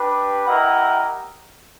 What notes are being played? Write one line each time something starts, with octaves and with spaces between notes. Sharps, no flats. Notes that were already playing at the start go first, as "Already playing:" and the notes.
Already playing: D4 G4 B4
E4 G4 A#4 D#5 F#5